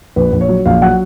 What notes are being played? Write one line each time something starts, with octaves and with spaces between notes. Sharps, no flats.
A#1 B4
A#1
C#5
F#3
A#1 F5
F#3 F#5